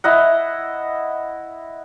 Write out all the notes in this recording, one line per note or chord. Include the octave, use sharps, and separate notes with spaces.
E4 D#5 F#5